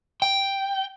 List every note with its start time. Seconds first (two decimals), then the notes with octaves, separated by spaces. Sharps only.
0.22 G5